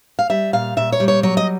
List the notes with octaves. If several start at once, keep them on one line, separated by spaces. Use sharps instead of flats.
F5
G3 E5
A#2 F5
A#2 E5
C#5
G3
C#5
F#3 C#5
D#5